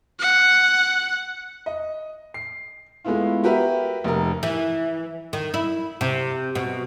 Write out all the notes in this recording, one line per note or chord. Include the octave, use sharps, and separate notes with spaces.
F#5
D#5
C7
G#3 A3 B3 E4 F4
F#4 G4 A#4 B4 E5
F1 A#4
E3
D#3
E4
C3
B2